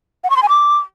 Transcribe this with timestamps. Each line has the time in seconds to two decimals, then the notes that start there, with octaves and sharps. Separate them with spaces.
0.24 F#5
0.30 C#6
0.36 C6
0.43 G#5
0.49 D6